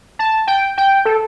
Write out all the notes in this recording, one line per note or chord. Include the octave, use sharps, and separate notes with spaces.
A5
G5
G5
A4